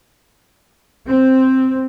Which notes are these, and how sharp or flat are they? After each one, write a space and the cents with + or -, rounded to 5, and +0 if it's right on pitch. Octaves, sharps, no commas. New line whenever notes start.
C4 +0